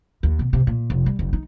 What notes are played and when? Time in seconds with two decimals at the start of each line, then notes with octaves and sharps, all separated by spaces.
0.23 D#2
0.39 B2
0.53 C3
0.67 A#2
0.90 F1
1.06 G3
1.19 F#1
1.33 D#4